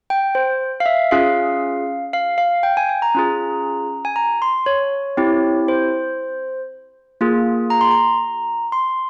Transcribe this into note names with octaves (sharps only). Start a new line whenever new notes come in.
G5
C5
F5
E5
C#4 F4 G#4 F5
F5
F5
G5
G#5
G#5
A#5
C#4 F4 G#4
G#5
A#5
C6
C#5
C4 E4 G4
C5
A#3 F4 G#4
A#5
C6
A#5
C6